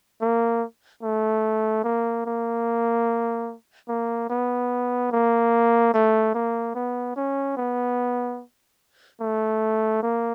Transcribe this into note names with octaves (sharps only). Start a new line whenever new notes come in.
A#3
A3
A#3
A#3
A#3
B3
A#3
A3
A#3
B3
C#4
B3
A3
A#3